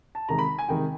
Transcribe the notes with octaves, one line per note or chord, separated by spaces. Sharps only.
A5
C3 D#3 G#3 A#5
B5
G#5
C3 D#3 G#3 G5